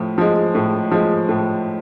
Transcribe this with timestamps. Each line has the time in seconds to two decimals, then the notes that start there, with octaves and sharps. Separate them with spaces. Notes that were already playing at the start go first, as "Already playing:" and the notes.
Already playing: A2 F3
0.18 F3 G#3
0.55 A2
0.92 F3 G#3
1.29 A2